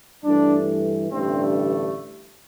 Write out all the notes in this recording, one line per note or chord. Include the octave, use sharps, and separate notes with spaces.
G2 E3 A3 D4
A1 G2 D3 A3 C4